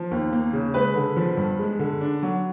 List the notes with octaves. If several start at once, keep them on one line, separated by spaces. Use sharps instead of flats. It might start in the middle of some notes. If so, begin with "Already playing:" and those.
Already playing: F3
D#2
A#3
C#3
G#3 B4
D3
F3
G2
G#3
D3
D4
F#3